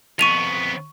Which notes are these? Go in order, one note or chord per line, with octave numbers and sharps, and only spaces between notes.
F2 B3 C#6 D#7 F7